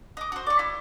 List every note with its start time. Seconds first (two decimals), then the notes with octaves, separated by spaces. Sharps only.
0.17 D#5 D6
0.32 F#4 C5
0.47 D5 C#6
0.59 E4